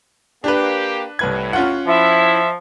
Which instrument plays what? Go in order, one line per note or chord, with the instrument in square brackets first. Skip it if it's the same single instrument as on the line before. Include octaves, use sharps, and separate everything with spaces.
[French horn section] A#3 G4 [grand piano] D4 B4
[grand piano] C2 B4 G#6 [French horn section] A2
[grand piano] C#4 F4 F#5
[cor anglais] F3 [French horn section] E4 [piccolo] E5